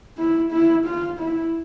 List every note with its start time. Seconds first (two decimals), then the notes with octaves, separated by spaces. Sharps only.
0.18 E4
0.52 E4
0.86 F4
1.19 E4